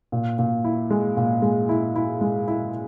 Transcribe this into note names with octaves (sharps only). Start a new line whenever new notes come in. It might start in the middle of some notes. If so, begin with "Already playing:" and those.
A#2
A#2
E4
G#3
A#2
G#3
E4
E4
G#3
E4